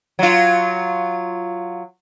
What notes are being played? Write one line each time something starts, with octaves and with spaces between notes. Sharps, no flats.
F#3 F4